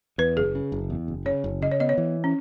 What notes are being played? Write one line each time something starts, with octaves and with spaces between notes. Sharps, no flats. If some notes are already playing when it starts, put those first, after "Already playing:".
E2 B4
F#1 G#4
C#3
F#1
E2
F#1
C#3 C#5
F#1
C#3 D#5
C#5
B3 D#5
C#5
E3
C#4